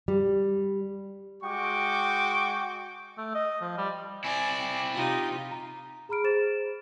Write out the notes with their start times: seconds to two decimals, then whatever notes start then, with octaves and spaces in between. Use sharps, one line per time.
0.08 G3
1.43 G#3 F#4 G5 C#6 D6
3.18 A3
3.35 D#5
3.61 F3
3.78 G3
4.24 C4 E4 D5 G#5
4.60 G5
4.95 C3 D#4 F4 G4
5.51 A#5
6.09 G#4 A#5 B5 F6 D7
6.24 G#4 C5 A6 E7